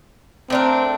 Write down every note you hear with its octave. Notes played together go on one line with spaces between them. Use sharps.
A3 C4 D4 A#4